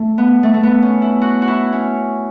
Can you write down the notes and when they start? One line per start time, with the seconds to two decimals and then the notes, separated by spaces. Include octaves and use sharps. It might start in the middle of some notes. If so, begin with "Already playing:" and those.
Already playing: A3
0.18 B3
0.43 A3
0.54 A3
0.63 B3
0.82 C#4
1.02 E4
1.22 F#4
1.42 F#4
1.47 E4
1.73 C#4